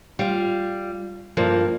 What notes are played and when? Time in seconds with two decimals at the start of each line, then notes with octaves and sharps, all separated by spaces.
0.19 G3 F4 F5
1.37 G2 F3 A#3